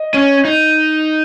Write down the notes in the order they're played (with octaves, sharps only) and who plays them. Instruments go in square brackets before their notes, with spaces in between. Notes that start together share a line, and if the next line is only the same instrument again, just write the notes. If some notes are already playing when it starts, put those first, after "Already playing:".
Already playing: [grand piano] D#5
[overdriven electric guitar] C#4
D#4